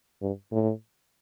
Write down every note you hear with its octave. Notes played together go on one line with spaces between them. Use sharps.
G2
A2